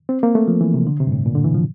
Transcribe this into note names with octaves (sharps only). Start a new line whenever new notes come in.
C4
A#3
A3
F3
E3
C3
D3
C3
G2
A2
A#2
D3
E3
F3